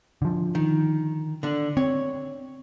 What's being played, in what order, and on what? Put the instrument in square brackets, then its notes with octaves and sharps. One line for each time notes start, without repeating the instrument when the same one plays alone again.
[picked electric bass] D3 F3
[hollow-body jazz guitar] D#3
D3 D4
[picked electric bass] C4 [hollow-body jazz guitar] C#5